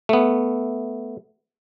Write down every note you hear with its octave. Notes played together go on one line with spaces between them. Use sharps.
A3 B3